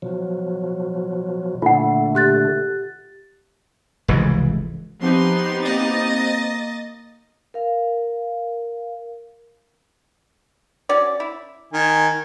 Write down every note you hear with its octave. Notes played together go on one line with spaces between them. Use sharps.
B2 F3 F#3
A#2 D3 A3 F4 F#5
G4 F#6 A6
F1 C#2 G#2 E3
F3 B3 C4 D#4 G4 C6
A#3 D#5 A6
A#4 F5
C#4 F#4 D5
E4
D#3 G#5